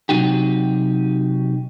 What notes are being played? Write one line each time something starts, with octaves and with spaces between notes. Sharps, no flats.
C3 F#3 D#4 F#4 G4